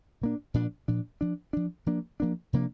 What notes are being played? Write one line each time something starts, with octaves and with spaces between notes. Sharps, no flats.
A#2 A#3 D4
A#2 F3 D4
A#2 F3 D4
F3 D4
F3 D4
F3 A#3 D4
F3 A#3 D4
C3 F3 A#3 D4